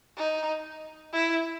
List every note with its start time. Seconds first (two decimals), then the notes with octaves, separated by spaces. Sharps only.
0.17 D#4
1.13 E4